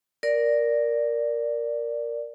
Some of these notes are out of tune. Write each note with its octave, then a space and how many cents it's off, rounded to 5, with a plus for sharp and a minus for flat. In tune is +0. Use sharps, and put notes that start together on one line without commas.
A#4 +0 D5 +0